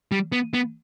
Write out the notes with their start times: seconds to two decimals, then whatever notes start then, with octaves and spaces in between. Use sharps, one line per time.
0.12 G3
0.32 B3
0.54 B3